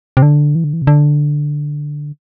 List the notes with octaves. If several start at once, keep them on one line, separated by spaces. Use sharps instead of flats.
C3
D3
E3
D3
E3
C3
D3